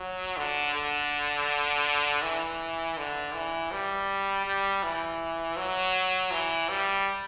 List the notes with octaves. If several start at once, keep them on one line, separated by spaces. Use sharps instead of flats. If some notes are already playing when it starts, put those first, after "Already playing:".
Already playing: F#3
D3
D3
E3
D3
E3
G3
G3
E3
F#3
E3
G3